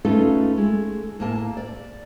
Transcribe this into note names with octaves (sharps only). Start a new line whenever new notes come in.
A3 C#4 D#4 F4 A4 B4
G#3 A3
A2 A#3 A5
D5